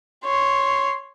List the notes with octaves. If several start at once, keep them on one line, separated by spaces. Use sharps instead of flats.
C#5 C6